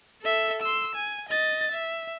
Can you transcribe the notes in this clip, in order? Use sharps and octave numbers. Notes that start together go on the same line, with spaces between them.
A4 E5
C6 E6
G#5
D#5 A6
E5